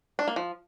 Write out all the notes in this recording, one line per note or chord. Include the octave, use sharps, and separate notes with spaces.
D4
A#3
F3